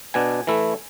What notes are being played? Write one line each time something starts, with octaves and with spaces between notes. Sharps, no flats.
B2 B3 D4 G#5
E3 A3 E4